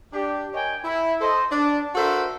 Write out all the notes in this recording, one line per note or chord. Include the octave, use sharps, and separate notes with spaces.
D4 G4
A#4 C#5 D#5 G5 G#5
E4
A4 C5 D#5
D4
D4 F#4 A4 A#4 C5 E5